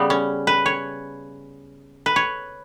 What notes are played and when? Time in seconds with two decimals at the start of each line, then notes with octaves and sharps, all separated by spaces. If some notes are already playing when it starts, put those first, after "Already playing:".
Already playing: C#3 G3 B3
0.10 C#4
0.47 B4
0.66 C#5
2.06 B4
2.16 C#5